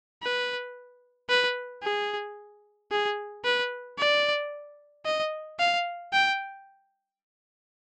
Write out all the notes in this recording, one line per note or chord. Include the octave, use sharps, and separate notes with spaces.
B4
B4
G#4
G#4
B4
D5
D#5
F5
G5